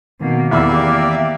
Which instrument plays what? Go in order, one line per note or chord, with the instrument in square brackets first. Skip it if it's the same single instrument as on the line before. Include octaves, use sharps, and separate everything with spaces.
[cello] B2 A#3 [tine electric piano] D#3 C4
[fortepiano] E2 B5 E6 [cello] A#3 G4 [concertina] D5 E5